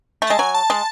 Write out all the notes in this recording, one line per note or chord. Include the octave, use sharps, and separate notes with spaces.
A3
G#3 A5
F#3 G#5
A5
G#3